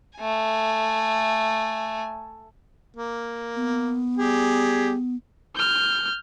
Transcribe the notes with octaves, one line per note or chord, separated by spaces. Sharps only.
A3 G#5
A#3
B3
G3 G4 G#4
F6 G6